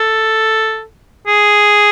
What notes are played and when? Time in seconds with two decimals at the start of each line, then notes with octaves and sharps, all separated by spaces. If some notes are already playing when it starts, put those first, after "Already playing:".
Already playing: A4
1.27 G#4